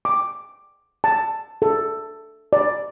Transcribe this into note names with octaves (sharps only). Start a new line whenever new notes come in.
D6
A5
A4
D5